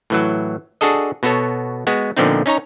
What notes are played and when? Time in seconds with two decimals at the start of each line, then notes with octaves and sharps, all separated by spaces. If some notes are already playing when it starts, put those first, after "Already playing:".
0.10 A2 E3 F#3
0.81 D4 F#4 G#4 A4 D#5
1.23 B2 B3 F#4 A4 C#5
1.87 G#3 B3 F#4
2.17 A#2 D3 F3 B3 C4 D#4
2.46 C#4 D#4 C#5 A#5